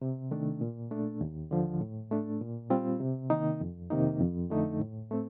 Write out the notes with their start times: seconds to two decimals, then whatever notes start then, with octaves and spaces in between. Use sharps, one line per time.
0.02 C3
0.31 D#3 A3 D4
0.61 A#2
0.91 A3 D4
1.21 D#2
1.51 D3 F3
1.81 A2
2.11 A3 D4
2.41 A#2
2.70 G3 C4 F4
3.00 C3
3.30 D#3 A#3 D#4
3.61 F2
3.90 C3 D#3 A#3 D#4
4.21 F2
4.50 D3 A3 D#4
4.80 A2
5.11 A3 C4